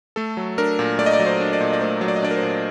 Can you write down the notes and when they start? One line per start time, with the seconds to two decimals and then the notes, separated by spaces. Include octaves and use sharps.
0.16 A3 A4
0.37 F#3
0.58 D4 A#4
0.79 A#2
0.99 A3 D5
1.06 D#5
1.13 D5
1.20 F#3
1.26 C5
1.40 D4
1.53 D5
1.61 A#2
1.73 D5
1.81 A3 C5
2.01 F#3
2.08 D5
2.16 D#5
2.23 D4 D5
2.31 A#4
2.36 C5
2.42 A#2